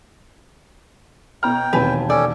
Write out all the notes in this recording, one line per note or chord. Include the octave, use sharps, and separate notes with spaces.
B2 G5 A#5 F6
E1 D#2 C4 B4 G#5 A5
C#4 A4 D5